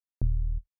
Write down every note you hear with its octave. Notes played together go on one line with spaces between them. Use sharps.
D#1